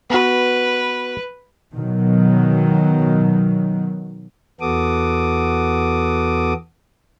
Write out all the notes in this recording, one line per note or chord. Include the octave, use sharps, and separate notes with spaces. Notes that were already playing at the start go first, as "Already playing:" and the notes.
B3 F#4 B4
B2 D#3 F#3
E2 B3 F#4 A4 D6 D#6